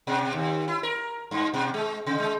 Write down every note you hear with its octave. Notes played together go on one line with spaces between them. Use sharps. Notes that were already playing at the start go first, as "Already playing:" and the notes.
B2
D#2
E4
A#4
G2
B2
G#3
C3
G#3